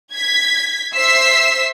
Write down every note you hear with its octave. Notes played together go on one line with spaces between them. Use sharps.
G#6 B6
C5 E5 E6 B6 C7